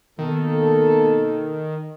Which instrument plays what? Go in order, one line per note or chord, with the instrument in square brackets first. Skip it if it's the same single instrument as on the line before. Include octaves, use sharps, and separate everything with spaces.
[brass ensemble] B2 A#3 A4 [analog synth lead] D#3